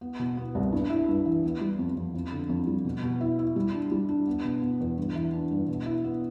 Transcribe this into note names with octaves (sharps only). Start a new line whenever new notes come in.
B3
B2
B3
C2
G2
E4
G2
E3
B3
G3
F2
F2
F2
D3
F2
G3
B2
B2
E4
E4
G3
D4
G3
D4
B3
B2
B3
E2
G2
E3
D4
G2
B2
E4
B3